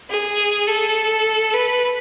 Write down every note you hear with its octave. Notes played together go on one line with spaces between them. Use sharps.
G#4
A4
B4